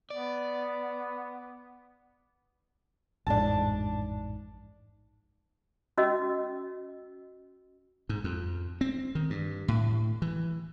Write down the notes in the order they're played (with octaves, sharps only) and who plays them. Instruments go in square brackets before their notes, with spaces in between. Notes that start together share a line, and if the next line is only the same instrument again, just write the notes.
[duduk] B3 [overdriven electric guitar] D5
[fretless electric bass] A1 F2 G#2 [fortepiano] D4 A5
[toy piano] C#4 F#4 D#5 E6
[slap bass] G#2
F2
C4
D#3
G2
A2
E3